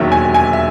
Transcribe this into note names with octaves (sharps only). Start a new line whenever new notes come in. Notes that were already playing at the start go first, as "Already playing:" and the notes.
Already playing: E1 D#2 D#3 F#3 E5
G#5
G#5
E5